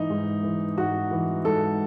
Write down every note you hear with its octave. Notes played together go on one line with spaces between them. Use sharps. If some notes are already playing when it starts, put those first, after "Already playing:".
Already playing: G#2 E3 D#4
G#2
E3
G#2 F#4
E3
G#2 A4